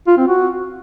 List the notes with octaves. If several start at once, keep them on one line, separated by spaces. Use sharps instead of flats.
F4
C4
F#4